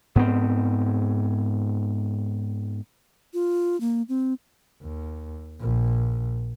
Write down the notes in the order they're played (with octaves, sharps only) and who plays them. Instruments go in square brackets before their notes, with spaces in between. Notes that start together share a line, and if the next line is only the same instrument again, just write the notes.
[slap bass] G#2 B3 C4
[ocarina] F4
A#3
C4
[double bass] D#2
A#1